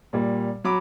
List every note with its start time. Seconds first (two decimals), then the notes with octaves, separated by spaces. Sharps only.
0.13 A#2 G3
0.64 F#3 B5 D6